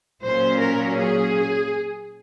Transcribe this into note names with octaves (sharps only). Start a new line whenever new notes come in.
A#2 F#3 C#4 C5
A#4
G#4